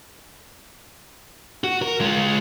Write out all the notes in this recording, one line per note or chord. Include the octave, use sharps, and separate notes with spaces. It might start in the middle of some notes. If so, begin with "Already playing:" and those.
F#4
A#4
G#3 F4